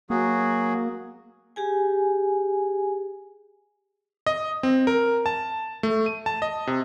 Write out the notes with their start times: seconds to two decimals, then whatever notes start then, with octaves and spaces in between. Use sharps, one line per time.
0.10 F#3 A#3 F#4 G#4
1.56 G4 G#4 G#5
4.27 D#5
4.63 C4
4.87 A#4
5.26 A5
5.83 A3
6.06 D#7
6.26 A5
6.42 D#5
6.67 C3